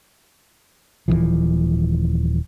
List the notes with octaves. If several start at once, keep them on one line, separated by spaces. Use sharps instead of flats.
D#1 E2 E3 F3